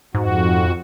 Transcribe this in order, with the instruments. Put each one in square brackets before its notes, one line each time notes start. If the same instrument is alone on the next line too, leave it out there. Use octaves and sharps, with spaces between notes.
[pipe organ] F2 F#4 [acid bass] G#2